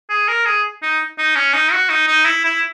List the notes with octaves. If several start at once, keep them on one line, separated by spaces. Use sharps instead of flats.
G#4
A#4
G#4
D#4
D#4
C#4
D#4
F#4
D#4
D#4
E4
E4